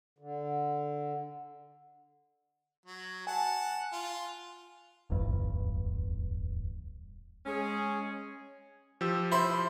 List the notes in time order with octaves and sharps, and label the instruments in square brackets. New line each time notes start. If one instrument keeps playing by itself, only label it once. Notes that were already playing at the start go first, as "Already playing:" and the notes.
[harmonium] D3
[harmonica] F#3
[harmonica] F#5 A5 [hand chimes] G#5
[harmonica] F4
[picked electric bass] D1 G1 E2 G2
[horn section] G#3 C#4 G#4
[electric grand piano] F3 G4 E6
[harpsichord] E4 C5